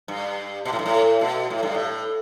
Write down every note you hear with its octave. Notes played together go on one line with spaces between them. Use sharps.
G2
B2
A2
G2
A2
B2
A2
G2
A2